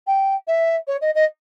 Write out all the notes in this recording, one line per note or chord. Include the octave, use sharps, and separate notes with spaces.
G5
E5
C#5
D#5
D#5